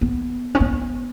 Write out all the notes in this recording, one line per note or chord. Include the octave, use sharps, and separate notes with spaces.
B3
C#4
B3